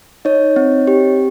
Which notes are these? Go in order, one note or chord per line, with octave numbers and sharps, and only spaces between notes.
D#4 C#5 D#5
C4
G4